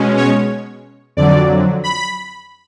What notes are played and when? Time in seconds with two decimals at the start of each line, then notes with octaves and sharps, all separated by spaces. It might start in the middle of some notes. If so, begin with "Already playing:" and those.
Already playing: B2 G#3 C#4
0.17 C#5
1.17 F2 D3 F#3 D5
1.84 B5